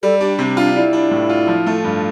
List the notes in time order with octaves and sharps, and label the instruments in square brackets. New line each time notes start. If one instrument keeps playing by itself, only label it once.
[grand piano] G3 [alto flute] A4
[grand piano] D4 [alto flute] G4
[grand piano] C3
[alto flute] D4 [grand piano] F4
[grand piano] G3 [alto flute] E4
[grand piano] D4
A2
F4
F3
A3
G2